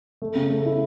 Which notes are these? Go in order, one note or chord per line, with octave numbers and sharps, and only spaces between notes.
A3
C#3
A3
E4